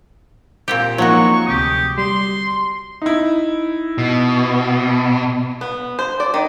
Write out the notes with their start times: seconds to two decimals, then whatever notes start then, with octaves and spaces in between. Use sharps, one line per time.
0.68 A#2 C4 G4
0.98 F3 F#3 G#3 A#3 D#4 F#4 C#6
1.46 D2 C3 G4 D#6
1.98 G3 C6
3.02 D#4 E4
3.98 B2
5.61 B3
5.99 C5
6.20 D5
6.34 D#3